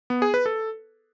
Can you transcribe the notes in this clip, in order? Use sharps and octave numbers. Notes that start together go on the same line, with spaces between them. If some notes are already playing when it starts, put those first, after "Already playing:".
B3
G#4
B4
A4